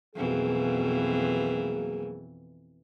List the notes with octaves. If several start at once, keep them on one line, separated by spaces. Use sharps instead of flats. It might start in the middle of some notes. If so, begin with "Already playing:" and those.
F2 B2 E3 F#3 A#3 G#4